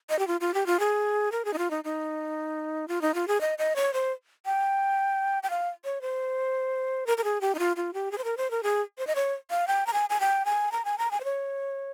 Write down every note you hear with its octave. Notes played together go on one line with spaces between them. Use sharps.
D#5
G4
F4
F4
G4
F4
G#4
A#4
G#4
D#4
F4
D#4
D#4
F4
D#4
F4
G#4
D#5
D#5
C#5
C5
G5
G5
F5
C#5
C5
A#4
A#4
G#4
G4
D#4
F4
F4
G4
G#4
C5
A#4
C5
A#4
G#4
C5
D#5
C#5
F5
G5
A#5
G#5
G#5
G5
G#5
A#5
G#5
A#5
G#5
C5
C#5